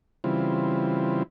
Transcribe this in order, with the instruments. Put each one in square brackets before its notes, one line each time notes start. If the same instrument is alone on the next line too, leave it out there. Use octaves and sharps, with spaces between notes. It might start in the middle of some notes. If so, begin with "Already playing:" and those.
[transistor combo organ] C#3 E3 G3 C4 E4 F4